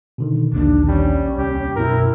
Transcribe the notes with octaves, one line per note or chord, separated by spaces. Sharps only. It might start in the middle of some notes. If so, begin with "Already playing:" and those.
B2 D3 D#3
A#1 D#2 D4
G3 C#4
C2 G4
F#2 B2 E4 A#4